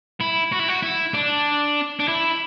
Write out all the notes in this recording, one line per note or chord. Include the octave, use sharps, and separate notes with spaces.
E4
F#4
E4
F#4
E4
D4
D4
E4